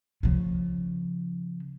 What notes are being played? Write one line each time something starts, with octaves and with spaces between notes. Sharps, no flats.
C#3 F3